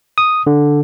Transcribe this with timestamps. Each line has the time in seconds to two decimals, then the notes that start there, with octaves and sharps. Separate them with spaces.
0.18 D#6
0.47 D3